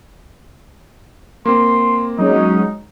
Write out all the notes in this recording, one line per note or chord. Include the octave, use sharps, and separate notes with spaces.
A#3 C4 C6
F#3 G#3 C#4 D#4